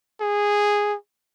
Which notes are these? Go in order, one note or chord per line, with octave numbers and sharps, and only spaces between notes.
G#4